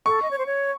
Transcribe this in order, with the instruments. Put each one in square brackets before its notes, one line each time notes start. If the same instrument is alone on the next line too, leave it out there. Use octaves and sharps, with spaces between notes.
[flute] A4 [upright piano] C#6
[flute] D#5
C#5
C5
C#5